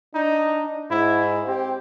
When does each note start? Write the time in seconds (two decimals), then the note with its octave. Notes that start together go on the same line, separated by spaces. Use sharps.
0.15 D4 D#4
0.91 G#2 E4
1.47 C4 G4